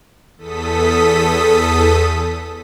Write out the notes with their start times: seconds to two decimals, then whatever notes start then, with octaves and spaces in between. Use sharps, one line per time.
0.37 E2 A4 D#6 B6